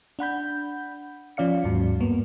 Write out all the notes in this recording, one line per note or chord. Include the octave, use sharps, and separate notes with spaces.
D4 F#5 B5 G6
F3 C#4 D5 F5 C#7
D#2 G#2 F#3
G2 A#3 B3